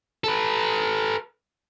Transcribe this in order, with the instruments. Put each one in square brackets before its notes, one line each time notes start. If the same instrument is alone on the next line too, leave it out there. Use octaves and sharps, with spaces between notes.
[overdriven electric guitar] A4 B4